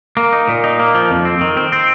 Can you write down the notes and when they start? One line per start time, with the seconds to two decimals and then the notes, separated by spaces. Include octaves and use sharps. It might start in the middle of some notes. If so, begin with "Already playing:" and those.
0.17 A#3
0.33 D#4
0.49 A#2
0.64 D#4
0.79 A#3
0.94 F3
1.11 F2
1.25 C4
1.41 D#3
1.57 C4
1.72 C4